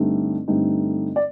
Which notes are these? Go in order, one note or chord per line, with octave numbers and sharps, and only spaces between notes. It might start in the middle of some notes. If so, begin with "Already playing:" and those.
Already playing: G2 D3 A3 C4 D#4
G2 D3 A3 C4 D#4
D5